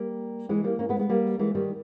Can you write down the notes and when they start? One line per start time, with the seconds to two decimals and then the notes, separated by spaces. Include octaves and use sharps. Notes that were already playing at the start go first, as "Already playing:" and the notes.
Already playing: G3 A#3
0.49 E3 G#3
0.64 G3 A#3
0.79 A#3 C#4
0.89 G#3 B3
0.99 G#3 B3
1.09 G3 A#3
1.39 E3 G#3
1.55 D#3 G3